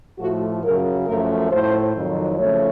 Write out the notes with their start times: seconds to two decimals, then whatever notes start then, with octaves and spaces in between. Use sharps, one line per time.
0.19 A2 F3 A3 F#4
0.63 F#2 C#3 F#3 A#4
1.06 F#2 F3 A3 A#4
1.51 A2 A3 C5
1.95 F2 D#3 F#3
2.39 C#3 F3 A3 C#5